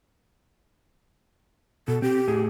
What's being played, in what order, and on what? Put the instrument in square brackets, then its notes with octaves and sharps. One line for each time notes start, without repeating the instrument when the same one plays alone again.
[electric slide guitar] B2 [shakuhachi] A4
[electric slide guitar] C4 [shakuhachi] G4
[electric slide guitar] A2 G#4